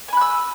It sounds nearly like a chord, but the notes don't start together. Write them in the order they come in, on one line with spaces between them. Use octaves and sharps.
G#5 B5 F#6 E6